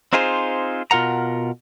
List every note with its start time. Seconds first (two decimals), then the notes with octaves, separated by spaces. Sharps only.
0.13 C4 D#4 F4 G#4 C5
0.91 B2 F4 A#4 F#5 A#5